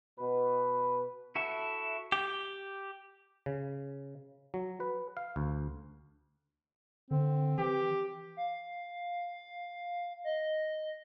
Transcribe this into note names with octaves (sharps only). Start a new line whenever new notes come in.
B2 B4
E4 F#4 A4 E5
G4
C#3
F#3
B4
F5
D2
D3 C4
E3 G4
F5
D#5